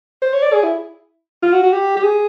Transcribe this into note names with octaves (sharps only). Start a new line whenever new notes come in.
C5
C#5
D5
G#4
E4
F4
F#4
F#4
G4
G4
G#4